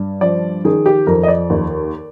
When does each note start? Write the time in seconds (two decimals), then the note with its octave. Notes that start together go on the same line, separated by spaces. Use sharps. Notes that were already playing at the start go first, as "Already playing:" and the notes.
Already playing: G2
0.21 F3 D5
0.65 D#3 G#4
0.86 G4
1.07 F2 A#4
1.23 D#5
1.28 D5
1.50 D#2